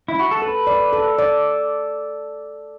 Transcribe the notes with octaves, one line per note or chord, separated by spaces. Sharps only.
E4
F#4
A4
A4 B4
D5
A4
D5